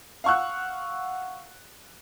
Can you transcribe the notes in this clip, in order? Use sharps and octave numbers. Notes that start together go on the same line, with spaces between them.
F5 F#5 C#6 E6 F#6